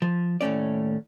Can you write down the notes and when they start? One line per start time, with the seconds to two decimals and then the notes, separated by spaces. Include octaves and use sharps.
0.02 F3
0.41 D#2 A2 A3 C#4 D5